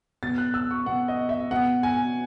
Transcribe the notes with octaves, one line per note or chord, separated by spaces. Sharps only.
B2 A6
F#6
E6
C#6
B2 F#5
D#5
E5
B2 F#5
G#5